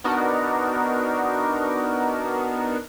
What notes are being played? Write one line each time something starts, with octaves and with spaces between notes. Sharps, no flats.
B3 D4 D#4 F#4 A#4